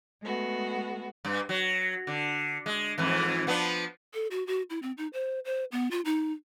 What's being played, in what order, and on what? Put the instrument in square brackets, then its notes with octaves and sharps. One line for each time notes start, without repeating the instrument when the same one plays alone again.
[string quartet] G#3 A3 B3 F#4
[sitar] G2
F#3
D3
G#3
F2 G#2 E3
F3 B3 D4
[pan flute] A4
F#4
F#4
E4
C4
D#4
C5
C5
B3
F4
D#4